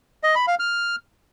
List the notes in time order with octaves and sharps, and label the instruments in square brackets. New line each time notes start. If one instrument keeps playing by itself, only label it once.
[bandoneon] D#5
B5
F5
F6